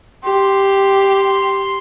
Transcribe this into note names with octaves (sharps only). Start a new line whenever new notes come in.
G4 C6